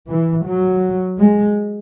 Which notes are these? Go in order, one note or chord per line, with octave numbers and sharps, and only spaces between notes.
E3
F#3
G#3